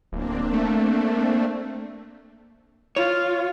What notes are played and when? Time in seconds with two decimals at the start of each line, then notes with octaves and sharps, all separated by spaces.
0.12 D1 A#3 C4 D4
0.53 A3
2.96 F4 C#5